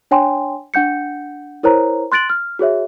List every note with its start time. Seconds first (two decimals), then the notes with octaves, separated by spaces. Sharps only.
0.11 D4 C#5 G5 G#5 C6
0.74 D4 F#5 G6 C#7
1.63 E4 A#4 C5 C#5 A#5
2.12 C6 F#6 A6 D7 F#7
2.30 F6
2.59 F#4 G#4 C#5 E5